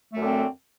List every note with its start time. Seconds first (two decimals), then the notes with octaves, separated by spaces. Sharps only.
0.12 A3
0.16 F#2
0.20 D3
0.24 C4